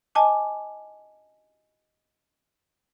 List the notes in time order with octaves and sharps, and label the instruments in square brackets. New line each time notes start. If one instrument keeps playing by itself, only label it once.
[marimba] D#5 G#5 A5 D6